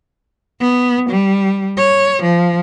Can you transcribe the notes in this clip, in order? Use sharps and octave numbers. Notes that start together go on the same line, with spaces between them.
B3
G3
C#5
F3